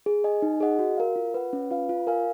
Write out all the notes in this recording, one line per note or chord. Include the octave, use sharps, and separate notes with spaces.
G#4
D#5 G#5
D#4
G#4 D#5 F#5
F#4
A#4 F5
F4
B4 F#5
C#4
F4 B4 F5
F4
A#4 F5 G#5